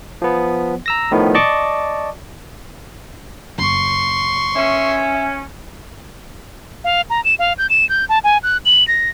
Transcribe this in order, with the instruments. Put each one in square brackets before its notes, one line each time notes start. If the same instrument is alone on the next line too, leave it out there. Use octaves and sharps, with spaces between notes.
[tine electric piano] F3 B3
A#5 E6 A#6
A2 D#3 F3 B3
D5 D#5 A5 C#6 D6
[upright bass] F#1 [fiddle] C6 C#6
[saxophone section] C#4 [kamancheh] E5
[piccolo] F5
A#5
E7
F5
G6
E7
G6
A5
G#5
F#6
F#7
A#6